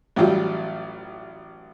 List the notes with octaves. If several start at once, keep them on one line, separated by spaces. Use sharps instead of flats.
A1 F#3 G3 F4